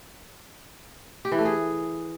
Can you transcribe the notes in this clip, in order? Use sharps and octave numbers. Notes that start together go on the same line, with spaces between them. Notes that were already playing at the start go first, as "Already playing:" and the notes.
G4
E3
A3
G#4